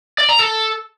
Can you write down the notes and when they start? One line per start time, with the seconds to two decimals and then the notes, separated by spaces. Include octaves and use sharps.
0.18 D5
0.29 A#5
0.39 A4